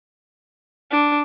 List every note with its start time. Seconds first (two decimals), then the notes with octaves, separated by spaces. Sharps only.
0.91 D4